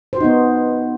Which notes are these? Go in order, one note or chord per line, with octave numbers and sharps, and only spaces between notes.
B3 D#4 F#4 C5